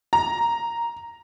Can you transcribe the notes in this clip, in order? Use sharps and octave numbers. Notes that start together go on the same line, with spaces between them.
A#5